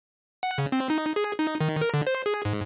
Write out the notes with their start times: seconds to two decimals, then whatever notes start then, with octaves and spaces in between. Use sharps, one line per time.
0.43 F#5
0.58 C#3
0.72 C4
0.90 D#4
1.16 G#4
1.39 D#4
1.61 D#3
1.81 A#4
1.94 D3
2.07 C5
2.26 G#4
2.45 G#2